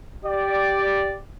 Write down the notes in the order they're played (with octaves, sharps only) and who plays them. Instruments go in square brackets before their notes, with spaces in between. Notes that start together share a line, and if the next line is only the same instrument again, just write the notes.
[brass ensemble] G4 D5